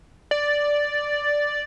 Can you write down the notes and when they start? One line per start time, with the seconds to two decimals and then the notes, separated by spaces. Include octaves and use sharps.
0.31 D5